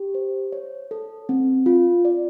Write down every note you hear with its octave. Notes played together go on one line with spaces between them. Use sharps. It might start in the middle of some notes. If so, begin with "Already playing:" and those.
Already playing: G4
C5
C#5
A4
C4
F4
D5